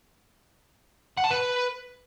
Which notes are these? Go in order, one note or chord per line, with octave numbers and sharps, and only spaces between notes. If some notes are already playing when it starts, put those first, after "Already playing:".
F#5
A5
B4